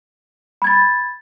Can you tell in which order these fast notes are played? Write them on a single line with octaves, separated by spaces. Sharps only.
B5 G#6 A6